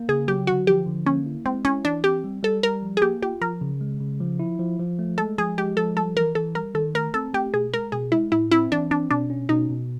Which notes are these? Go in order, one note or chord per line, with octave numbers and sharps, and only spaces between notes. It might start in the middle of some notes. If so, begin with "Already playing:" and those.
Already playing: A#3
C#3 G#4
F#3 G4
D3 F#4
F3 G4
D3
A#3 C#4
E4
G#3 C4
C#4 E4
E3 D4
C4 G4
G3
G3 A4
G3 A#4
F3
G#4
A#3 G4
F4 G4
F3 A#4
C#3
G#3
C#3
F3
E4
F3
F3
A3
G#3 A4
F3 G#4
G#3 G4
F3 A4
G3 A4
E3 A#4
E3 A4
G3 A#4
D#3 A4
A3 A#4
C4 A4
A3 G4
B2 G#4
G#3 A#4
B2 G#4
G#3 E4
A2 E4
C4 E4
E3 D4
C4 D4
B2 D4
C#4
B2 D#4
B2